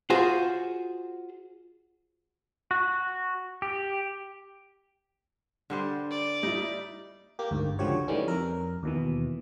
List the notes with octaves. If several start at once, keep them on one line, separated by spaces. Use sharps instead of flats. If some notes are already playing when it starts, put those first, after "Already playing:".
F4 F#4 G#4 C5
F#4
G4
D3 G3 C5
D5
G3 D#4 E4
A#3 G4
G1 D2 G#2
C#2 D3 F3 F#4 G4 C#5
D#3 E3 G3 A3 C#4
F2 A#4
D#2 B2 E3